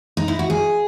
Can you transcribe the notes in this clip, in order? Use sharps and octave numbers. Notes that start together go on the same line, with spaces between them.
D#4
E4
F#4
G#4